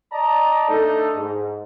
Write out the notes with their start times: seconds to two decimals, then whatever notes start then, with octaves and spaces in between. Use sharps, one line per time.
0.12 D5 D#5 A5 A#5
0.69 A3 D4 D#4 A4
1.15 G#2